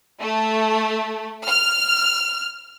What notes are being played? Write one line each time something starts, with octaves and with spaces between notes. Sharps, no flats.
A3
F6